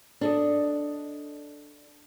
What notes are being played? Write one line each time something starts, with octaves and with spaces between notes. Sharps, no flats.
D4 A4 D#5